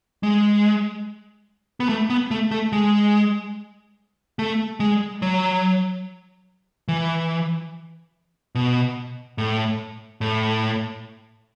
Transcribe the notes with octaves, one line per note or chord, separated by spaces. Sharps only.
G#3
B3
A3
B3
A3
A3
G#3
A3
G#3
F#3
E3
B2
A2
A2